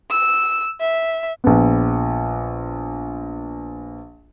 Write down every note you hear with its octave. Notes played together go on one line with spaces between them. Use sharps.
E6
E5
A#1 B3